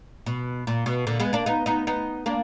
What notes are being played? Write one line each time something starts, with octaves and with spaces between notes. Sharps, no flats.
B2
A#2
B2
A#2 D3
G#3 B3
A#3 D4
B3 D#4
B3 D#4
B3 D#4
A#3 D4